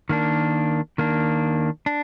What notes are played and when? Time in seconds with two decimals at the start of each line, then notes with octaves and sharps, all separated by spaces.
0.09 D#3 A#3 D4
0.98 D#3 A#3 D4
1.86 D4